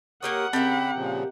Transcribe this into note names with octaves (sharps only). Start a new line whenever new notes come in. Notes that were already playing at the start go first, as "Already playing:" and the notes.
A#3 G4 A#4 C#5 F#5 D#6
C#3 C4 G4 A#4 E5 B5
A#2 C#3 F3